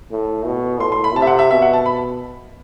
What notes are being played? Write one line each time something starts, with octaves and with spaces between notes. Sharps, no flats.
A2
B2
A2 C6
C6
B5
C3 A5
E5
F#5
E5
B2 E5
F#5
A5
B5